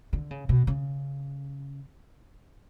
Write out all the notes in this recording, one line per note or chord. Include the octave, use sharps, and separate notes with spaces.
D3
C#3
B2
C#3